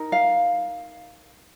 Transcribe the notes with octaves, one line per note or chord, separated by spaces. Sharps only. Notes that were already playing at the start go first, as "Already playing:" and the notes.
Already playing: D#4 A#4
F5